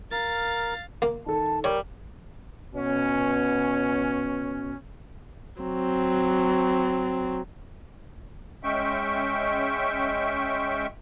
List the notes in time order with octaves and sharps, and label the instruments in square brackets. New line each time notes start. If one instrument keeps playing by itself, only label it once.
[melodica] A#4 [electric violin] F5 A6
[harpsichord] A#3
[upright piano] D#3 A4 [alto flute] A5
[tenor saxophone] G3 [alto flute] A#4 [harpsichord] C#5
[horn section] B2 B3 C#4
[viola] F#3 C4
[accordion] G#3 C#4 E5 G5 C#6